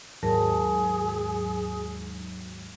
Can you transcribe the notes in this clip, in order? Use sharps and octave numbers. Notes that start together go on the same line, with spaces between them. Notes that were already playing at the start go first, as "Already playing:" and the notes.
D#2 G#2 F#3 G#4 A#4 A5